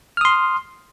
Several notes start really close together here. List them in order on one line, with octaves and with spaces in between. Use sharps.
F6 D#6 C6